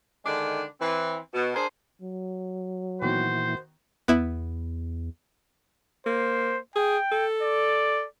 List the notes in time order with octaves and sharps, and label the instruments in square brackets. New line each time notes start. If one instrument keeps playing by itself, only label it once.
[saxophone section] D3 D#3 G#3 D4
E3 C4
B2
D4 G#4 A#4 C5
[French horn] F#3
[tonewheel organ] A#2 E3 [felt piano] D#3 B3 F#4 [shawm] C5
[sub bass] E2 [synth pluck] B3 E4
[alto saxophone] A#3 [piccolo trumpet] C5
[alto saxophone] G#4 [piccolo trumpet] G5
[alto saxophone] A4
[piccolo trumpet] D5